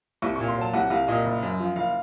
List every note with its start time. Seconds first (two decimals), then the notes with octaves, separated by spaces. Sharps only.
0.22 C2 C#6
0.36 A#2 C#6
0.48 C6
0.57 F#3 A5
0.74 C2 F#5
0.90 C2 F5
1.08 A#2 D#5
1.25 F#1
1.43 F#2
1.60 F3
1.76 F#1 F5